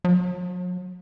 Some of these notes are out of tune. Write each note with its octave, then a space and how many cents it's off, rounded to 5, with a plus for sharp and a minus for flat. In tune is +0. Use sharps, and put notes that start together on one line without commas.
F#3 -40